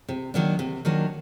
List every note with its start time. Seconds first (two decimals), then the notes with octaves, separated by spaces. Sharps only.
0.09 C3
0.34 D#3 F#3 A#3 D4
0.59 C3
0.85 D#3 F#3 A#3 D4